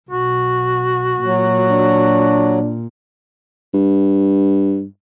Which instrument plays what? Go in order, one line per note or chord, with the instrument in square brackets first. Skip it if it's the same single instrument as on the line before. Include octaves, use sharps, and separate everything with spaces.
[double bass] B1 [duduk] F#4
[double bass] A#2 [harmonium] F#3
[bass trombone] D4
[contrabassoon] G2